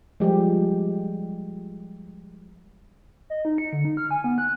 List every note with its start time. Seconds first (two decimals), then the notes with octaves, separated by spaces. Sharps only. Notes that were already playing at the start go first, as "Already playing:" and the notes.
0.20 F3 G3 G#3 G4
3.30 D#5
3.45 D#4
3.58 C#7
3.73 D3
3.85 D#4
3.97 F6
4.11 G#5
4.24 B3
4.38 F#6